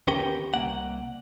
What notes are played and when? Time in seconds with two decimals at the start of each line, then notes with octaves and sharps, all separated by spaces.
0.07 D#2 B3 C#4 G4 A#4 G5
0.54 C2 A2 A#3 F#5